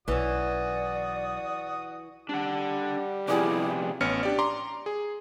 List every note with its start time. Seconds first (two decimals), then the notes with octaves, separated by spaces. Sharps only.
0.08 B1 E3 C#4 F#4 D5 D#6
2.29 G3 D4 F#5
3.28 C3 F3 B3 E4 G4 G#4 D5
4.00 A1 B3 C#4 F6 C#7
4.23 D4 G4 D5
4.39 A#5 C6 D6
4.86 G#4